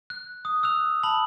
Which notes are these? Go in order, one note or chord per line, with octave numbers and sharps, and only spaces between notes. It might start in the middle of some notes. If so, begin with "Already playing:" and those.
F#6
D#6
E6 F#6 F7
A5 B5 F#7